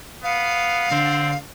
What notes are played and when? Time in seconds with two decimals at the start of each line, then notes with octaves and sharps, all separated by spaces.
0.23 B3 F5
0.91 D3 C4